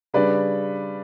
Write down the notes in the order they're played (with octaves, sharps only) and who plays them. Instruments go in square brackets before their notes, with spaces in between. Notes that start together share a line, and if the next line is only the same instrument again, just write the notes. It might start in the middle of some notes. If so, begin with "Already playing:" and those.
[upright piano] C#3 G3 D4 B4 D5